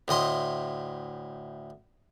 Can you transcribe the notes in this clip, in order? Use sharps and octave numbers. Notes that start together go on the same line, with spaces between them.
D2 A2 D#5 C6